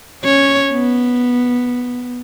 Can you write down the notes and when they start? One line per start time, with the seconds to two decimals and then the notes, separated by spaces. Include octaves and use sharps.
0.23 C#4 C#5
0.72 B3